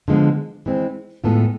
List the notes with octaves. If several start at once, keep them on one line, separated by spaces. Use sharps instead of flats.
D3 F3 G#3 B3
E3 G#3 C4
A2 G#3 B3 F4 A4